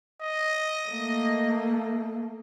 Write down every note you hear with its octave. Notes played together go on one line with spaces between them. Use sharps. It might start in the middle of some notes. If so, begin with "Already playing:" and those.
D#5
A3 A#3